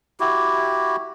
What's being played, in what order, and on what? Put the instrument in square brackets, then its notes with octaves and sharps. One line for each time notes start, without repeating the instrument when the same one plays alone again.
[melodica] E4 F#4 G4